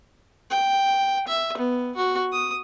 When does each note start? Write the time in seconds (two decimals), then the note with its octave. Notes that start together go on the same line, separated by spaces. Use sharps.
0.50 G5
1.27 E5
1.57 B3
1.96 F#4
2.32 D#6